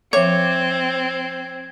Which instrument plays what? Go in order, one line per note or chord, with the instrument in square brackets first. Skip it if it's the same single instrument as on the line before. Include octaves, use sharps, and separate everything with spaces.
[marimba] F3 E5 D6 [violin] C4 [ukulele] C#5 [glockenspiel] G#6